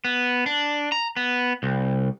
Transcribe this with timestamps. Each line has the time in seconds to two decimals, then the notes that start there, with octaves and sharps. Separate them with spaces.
0.05 B3
0.46 D4
0.92 A#5
1.17 B3
1.63 C2